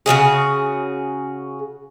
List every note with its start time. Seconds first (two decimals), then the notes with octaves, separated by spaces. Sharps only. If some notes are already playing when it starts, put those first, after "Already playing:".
0.06 C#3 F3 F#4 G#4